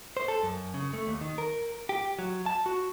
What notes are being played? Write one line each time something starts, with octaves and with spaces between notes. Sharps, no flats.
C5
A4
F#2
C#3
A3
D#2
D#3
A#4
G4
F#3
A5
F#4